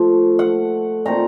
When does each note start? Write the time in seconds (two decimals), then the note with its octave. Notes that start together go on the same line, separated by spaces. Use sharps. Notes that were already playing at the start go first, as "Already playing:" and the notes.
Already playing: F3 A3
0.39 F#5
1.05 A#2 A3 C4 D#4 A#5